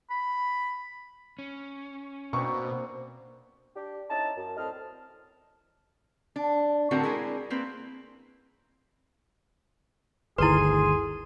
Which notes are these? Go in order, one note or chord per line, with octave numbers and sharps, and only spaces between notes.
B5
C#4
B2 A#3 C4 D4 C#6
D4 G4
C#4 D#4 E4 A5
F#2
A2 G3 C4 D#5 A5 F6
D4
A2 D3 C4 D4 F#4 A#4
G#3 D4 E4 G#4 A#4
A#3 C4 B4
G1 D2 D#3 E4 G#4 B4 C6 D#7